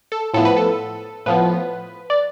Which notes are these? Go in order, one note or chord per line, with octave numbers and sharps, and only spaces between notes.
A4
A2 F3 B3 A4
B4
A4
A2 F3 B3 B4
D5